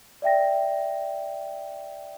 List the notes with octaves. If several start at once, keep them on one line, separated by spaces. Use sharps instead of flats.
D5 E5 G5 A#6